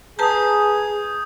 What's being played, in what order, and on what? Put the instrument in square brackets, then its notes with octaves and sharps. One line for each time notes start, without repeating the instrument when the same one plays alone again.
[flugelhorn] G#4 [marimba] B4 A5 A#5 [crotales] D#6 G6